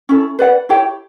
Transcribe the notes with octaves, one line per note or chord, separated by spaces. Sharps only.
C#4 E4 A4
B4 D5 F#5
E4 G4 C#5 G5